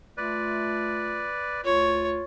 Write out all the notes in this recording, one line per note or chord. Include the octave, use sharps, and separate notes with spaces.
A3 F4 B4 D5
D2 F4 C#5